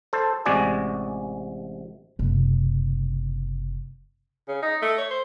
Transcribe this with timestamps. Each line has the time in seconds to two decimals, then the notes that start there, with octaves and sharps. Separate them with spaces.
0.13 A4 C5
0.46 A1 C3 G#3 F#4 D5 G#5
2.19 F#1 C3
4.48 C#3
4.62 D#4
4.82 A3
4.98 C#5
5.10 C5